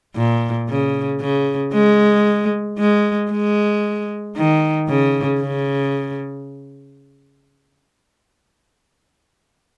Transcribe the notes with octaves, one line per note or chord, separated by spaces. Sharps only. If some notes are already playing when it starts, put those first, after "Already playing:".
A#2
C#3
C#3
G#3
G#3
G#3
D#3
C#3
C#3